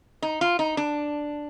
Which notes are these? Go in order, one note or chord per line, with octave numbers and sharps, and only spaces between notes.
D#4
F4
D#4
D4